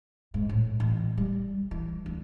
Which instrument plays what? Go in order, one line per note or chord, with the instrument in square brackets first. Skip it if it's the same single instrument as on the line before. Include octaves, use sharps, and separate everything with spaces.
[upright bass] G#2
A2
A1
G3
E3
D2